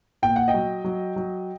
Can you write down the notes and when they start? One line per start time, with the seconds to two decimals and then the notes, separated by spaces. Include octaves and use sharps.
0.22 A#2 G5
0.36 F#5
0.48 D#5 G5
0.54 F#3
0.84 F#3
1.16 F#3